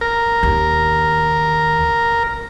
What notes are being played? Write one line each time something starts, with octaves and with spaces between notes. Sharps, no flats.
A#4
D#2